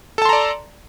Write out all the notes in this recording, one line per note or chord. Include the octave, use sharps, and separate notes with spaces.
A4 D5 A5 A#5 C6